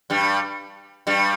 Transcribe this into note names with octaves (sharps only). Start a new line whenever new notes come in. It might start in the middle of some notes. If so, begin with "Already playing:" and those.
G2 G3
G2 G3